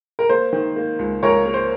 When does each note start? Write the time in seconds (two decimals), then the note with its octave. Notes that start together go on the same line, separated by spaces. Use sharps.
0.19 A#4
0.29 A#3 C5
0.53 D#3
0.76 A#3
0.99 C#2
1.23 C#2 A#4 C#5
1.46 A#3
1.54 C5